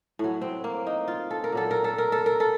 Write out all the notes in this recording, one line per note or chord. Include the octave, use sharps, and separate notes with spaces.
A2 F#3
C4
A#3
D#4
F4
A4
A#4
A#2 F#3 A4
A#4
A4
A#4
A4
A#4
A4